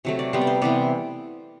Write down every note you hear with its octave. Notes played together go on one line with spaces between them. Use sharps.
C3 F#3 A3
D5
C3 G3 B3 C5
D5
C5
C3 E3 B3 D5